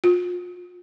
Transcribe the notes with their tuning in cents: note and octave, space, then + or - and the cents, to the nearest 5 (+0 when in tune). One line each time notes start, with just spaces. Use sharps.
F4 +35